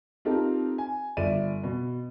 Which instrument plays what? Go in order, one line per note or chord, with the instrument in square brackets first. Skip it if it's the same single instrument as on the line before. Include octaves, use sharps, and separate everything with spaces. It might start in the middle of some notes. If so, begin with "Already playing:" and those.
[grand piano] C4 D#4 F4 G4 A4 A#4
G#5
G1 D5 E5 D#7
B2